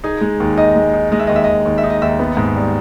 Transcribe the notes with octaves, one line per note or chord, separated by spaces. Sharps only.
D#4 G#4
G#3
D#2
D#4 D#5
G#3
D#4
G#3 D#5
E5
D#2 D#5
E5
D#2 D#5
D#2
E5
D#4
D#5
D#2 E5
B3
G#2
G3